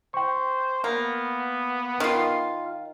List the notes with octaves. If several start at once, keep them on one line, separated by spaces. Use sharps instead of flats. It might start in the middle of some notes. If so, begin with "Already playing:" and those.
C5 G5 C#6
A#3 B3
D#3 F4 F5